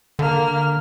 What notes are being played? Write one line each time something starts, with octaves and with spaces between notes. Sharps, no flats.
D3 A#3 F6